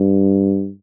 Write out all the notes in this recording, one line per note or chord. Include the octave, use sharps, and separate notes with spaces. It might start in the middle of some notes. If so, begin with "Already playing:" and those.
Already playing: G2